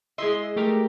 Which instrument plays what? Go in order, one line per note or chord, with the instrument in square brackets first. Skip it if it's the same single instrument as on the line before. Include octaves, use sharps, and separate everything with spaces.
[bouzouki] G#3 E4 D#5 [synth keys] E5 C6
[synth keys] A3 G4 A#4